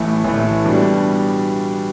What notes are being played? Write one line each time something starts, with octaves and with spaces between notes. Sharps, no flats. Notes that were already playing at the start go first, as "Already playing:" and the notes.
Already playing: A1 A2 E3 A3
A1 A2 E3 A3
B2 G3 D4